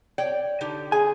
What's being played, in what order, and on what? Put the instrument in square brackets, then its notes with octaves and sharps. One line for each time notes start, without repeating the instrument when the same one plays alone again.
[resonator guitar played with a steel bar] C#5 D5 G5
D3 D#4 G4
[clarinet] G#4 [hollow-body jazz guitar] G#5